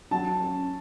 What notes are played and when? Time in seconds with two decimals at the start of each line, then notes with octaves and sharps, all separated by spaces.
0.11 F#3 A5
0.40 C#4